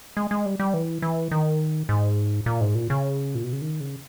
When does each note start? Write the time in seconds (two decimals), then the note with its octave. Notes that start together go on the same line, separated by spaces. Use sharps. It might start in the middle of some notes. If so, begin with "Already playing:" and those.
0.17 G#3
0.31 G#3
0.46 G3
0.60 G3
0.74 E3
1.02 E3
1.31 D#3
1.89 G#2
2.46 A#2
2.61 G#2
2.75 A#2
2.90 C#3
3.35 A#2
3.43 B2
3.53 C#3
3.62 D#3
3.80 C#3